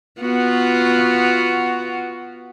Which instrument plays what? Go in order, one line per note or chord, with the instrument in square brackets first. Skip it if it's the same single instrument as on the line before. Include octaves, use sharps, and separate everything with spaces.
[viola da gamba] B3 F4 F#4